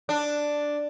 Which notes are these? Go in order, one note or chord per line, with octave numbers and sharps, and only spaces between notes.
D4